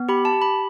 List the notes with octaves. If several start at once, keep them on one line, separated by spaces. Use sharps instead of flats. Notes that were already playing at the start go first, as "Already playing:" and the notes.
Already playing: B3
G4 B5
A5
G4
B5